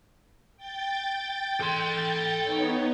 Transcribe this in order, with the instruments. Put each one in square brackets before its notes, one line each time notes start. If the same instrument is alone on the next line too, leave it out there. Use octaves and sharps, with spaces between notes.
[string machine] G5 G6 A6
[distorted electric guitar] A4 C6
[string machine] B3 D#4 C#5